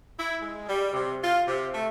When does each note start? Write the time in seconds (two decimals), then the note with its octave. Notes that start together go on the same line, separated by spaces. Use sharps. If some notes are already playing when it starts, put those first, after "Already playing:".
0.19 E4
0.42 G#3
0.69 G3
0.93 C3
1.23 F4
1.48 C3
1.74 A3